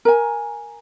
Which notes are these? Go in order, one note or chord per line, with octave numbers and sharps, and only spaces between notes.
A#4 G#5